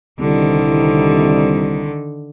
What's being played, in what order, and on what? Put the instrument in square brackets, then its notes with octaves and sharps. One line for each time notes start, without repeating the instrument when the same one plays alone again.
[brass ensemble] C2 [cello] D3 D#3